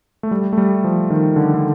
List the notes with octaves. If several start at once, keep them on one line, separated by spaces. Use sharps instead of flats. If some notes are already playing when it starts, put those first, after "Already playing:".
A3
G3
A3
G3
F3
D#3
D3
D3